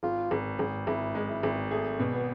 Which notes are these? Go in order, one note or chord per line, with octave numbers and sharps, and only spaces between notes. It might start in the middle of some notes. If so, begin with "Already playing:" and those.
G#1 F4
G#1
G#1
G#1 E4
G#3
E4
G#1
A3 G#4
B2
B3